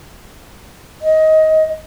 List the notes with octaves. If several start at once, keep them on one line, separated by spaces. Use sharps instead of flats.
D#5